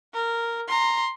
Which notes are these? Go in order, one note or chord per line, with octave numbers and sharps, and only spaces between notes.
A#4
A#5 C6